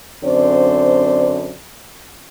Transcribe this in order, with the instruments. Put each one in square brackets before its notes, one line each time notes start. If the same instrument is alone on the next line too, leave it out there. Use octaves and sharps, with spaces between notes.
[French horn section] F#2 D3 C4 C5 D5